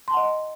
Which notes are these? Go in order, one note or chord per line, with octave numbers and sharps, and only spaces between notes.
D#5 F#5 A5 C6